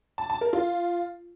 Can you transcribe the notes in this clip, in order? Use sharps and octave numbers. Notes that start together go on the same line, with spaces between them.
A5
A5
A#4
F4